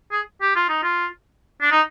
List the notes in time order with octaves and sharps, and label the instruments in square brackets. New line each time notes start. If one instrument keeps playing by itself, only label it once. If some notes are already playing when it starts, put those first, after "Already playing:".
[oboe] G#4
G4
F4
D#4
F4
D4
D#4